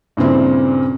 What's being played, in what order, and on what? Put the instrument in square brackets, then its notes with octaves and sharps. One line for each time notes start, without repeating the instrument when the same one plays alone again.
[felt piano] G2 A#2 C#3 C4 E4